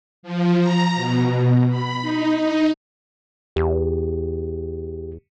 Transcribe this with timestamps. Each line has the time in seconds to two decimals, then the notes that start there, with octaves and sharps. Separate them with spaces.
0.23 F3
0.59 A#5
0.95 B2
1.25 B2
1.69 B5
2.02 D#4
2.40 D#4
3.56 E2 G4